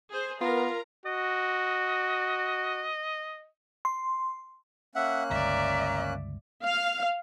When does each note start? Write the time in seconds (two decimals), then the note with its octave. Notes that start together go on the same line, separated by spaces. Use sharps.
0.11 G#4 C5
0.41 B3 F4 A#4 A#5
1.06 F#4 D#5
3.85 C6
4.95 A#3 C#4 E5 F#5 F#6
5.30 G1 C#2 D5 E5 A#5
6.64 F5